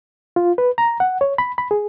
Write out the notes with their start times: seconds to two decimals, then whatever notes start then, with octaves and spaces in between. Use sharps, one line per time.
0.36 F4
0.58 B4
0.78 A#5
1.00 F#5
1.21 C#5
1.38 B5
1.58 B5
1.71 G#4